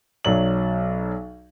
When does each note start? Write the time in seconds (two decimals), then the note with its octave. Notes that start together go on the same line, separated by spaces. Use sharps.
0.25 B1 F#3 D5 F#7